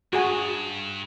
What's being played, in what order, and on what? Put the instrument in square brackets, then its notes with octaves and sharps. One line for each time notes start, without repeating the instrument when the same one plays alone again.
[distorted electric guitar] G2 [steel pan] F#4 G#4 G#5